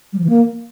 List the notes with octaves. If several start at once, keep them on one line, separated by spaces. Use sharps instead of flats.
G3
F3
E3
A#3